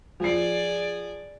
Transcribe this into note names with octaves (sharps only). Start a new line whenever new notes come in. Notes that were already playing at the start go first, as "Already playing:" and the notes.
F3 G#4 D5 C7